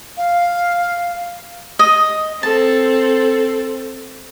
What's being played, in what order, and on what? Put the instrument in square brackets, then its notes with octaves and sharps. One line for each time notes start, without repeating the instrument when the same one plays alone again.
[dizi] F5
[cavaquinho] D#5
[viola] C4 A4 [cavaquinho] A5